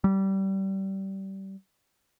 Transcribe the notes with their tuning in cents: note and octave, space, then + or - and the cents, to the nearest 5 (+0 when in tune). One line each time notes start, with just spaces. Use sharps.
G3 -25